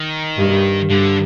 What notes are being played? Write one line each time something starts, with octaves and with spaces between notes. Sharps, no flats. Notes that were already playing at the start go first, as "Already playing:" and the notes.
Already playing: D#3
G2
G2 D3